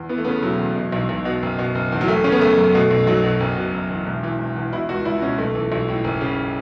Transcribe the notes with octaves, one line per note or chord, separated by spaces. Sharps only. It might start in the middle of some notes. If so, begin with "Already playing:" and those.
Already playing: E2
E3 B3
A3
C#3 B3
E1 F#3
E2
B2
B1
B1
B2
F#1
B2
F#1
E2
F#3
F#1 A3
C#3 C#4
B3
F#1 A3
F#2
B2 A3
B1
B1 F#3
B2
F#1
B2
F#1
E2
E1
E3
E1
E2
B2 E4
C#2 F#4
C#2 E4
B2 C#4
B1 A3
E3
B1
A2
F#1
C#3